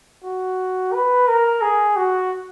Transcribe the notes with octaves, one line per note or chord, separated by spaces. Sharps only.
F#4
B4
A#4
G#4
F#4